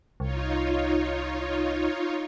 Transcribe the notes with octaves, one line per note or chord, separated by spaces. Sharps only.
C2 D#4 F4 C#5